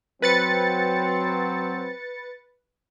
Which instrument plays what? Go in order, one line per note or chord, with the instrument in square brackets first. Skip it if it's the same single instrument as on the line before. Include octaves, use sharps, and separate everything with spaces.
[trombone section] F#3 C4 [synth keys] B4 A6 C#7